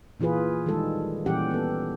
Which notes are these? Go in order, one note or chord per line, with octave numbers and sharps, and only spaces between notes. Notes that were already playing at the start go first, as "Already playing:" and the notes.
A#2 E3 F4 G#4 B4
D#3 G3 G#3 A4
A#2 E3 G3 C#4 G4 F#5
B3 A4